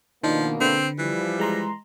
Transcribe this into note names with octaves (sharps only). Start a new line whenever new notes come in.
B2 D#3 F3 A#3 D4 D#4
D3 C4 B4
E3 F3 G3
G#3 A#5 C6